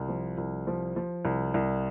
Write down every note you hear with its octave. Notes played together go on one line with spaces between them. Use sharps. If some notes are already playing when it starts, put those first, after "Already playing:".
Already playing: C2
F3
C2
F3
F3
C2
C2